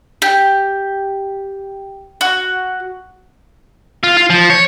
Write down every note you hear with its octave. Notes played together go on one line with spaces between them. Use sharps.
G4
F#4
F4
F4
F3
C#5